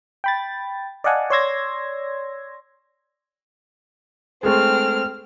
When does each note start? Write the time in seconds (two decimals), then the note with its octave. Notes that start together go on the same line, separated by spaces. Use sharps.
0.24 G5 B5 A6
1.04 D5 D#5 F5 F#5 G#5 A5
1.30 C#5 D5 C6 E6 G#6 A#6
4.43 G#3 A3 C4 F6